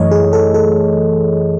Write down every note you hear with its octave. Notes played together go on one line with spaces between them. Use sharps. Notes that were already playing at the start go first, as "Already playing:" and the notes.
Already playing: F#2 E3 A3 C#5 D#5
G#4
A4
A4